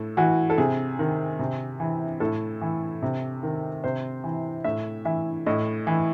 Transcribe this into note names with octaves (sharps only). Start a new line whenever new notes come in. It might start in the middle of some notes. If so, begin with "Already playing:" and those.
Already playing: A2 A4
E3 F#4
A4
C3 G#4
D#3
C3
E3
A2 A4
E3
C3
D#3
C3 C5
E3
A2 E5
E3 E5
A2 D#5
E3